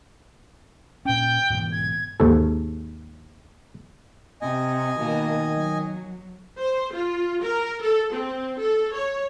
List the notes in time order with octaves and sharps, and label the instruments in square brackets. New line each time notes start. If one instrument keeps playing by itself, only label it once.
[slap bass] A#2 C#4 [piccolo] G5
[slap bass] G#2 B2 E3
[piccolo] G#6
[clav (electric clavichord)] D#2 G#2 A4
[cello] C3 [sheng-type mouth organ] D#5 G#5
[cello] B2 A#3 [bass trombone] D#3
[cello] F#3
[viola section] C5
F4
A#4
A4
C4
A4
C#5